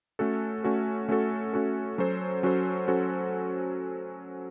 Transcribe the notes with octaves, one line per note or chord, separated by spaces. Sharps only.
A3 C#4 F#4 A4
A3 C#4 F#4 A4
A3 C#4 F#4 A4
A3 C#4 F#4 A4
F#3 C#4 F#4 A4 C5
F#3 C#4 F#4 A4 C5
F#3 C#4 F#4 A4 C5